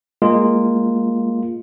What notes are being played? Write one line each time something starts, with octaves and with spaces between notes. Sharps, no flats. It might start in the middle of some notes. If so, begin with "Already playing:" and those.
G#3 A#3 F4